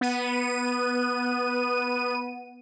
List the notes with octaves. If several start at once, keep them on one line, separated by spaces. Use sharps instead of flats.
B3 D#7